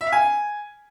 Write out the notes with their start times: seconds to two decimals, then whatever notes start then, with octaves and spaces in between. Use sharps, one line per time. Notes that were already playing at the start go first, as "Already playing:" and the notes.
0.01 E5
0.07 F5
0.12 G#5